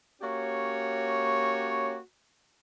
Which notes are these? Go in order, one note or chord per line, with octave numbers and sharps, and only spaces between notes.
A#3 C#4 F#4 G4 C#5